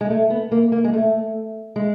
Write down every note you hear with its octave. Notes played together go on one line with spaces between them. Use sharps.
G#3
A3
B3
A#3
A#3
G#3
A3
G#3